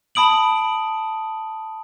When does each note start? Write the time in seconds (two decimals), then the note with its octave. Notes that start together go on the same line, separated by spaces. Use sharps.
0.15 A5 B5 D#6 D7 F#7